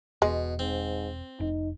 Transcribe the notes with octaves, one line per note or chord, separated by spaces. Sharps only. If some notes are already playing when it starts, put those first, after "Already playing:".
E1 B2 G#3
G#2 C4
F1 D#4